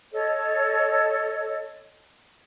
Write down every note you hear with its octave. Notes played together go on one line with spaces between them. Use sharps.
A4 C#5 D#5